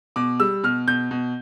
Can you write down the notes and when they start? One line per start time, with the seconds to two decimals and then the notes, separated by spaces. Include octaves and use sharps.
0.16 B2 D6
0.40 G3 E6
0.63 B2 F6
0.88 B2 G6
1.11 B2